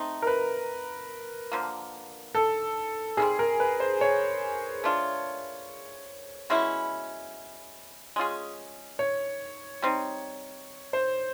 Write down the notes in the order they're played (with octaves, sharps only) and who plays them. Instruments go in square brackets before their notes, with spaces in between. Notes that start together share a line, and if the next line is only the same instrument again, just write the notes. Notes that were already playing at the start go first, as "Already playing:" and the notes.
Already playing: [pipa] A3 C4 D#4
[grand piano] A#4
B4
[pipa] D3 F3 A#3
[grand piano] A4
[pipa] D#3 G3 C4 [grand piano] G#4
[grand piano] A#4
B4
C5
C#5
[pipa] A3 D4 F4
B2 G#3 C#4 E4
G#3 C#4 F4 G#4
[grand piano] C#5
[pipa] G3 C4 D#4
[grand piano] C5